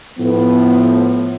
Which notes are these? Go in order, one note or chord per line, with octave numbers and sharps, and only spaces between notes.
A2 F3 B3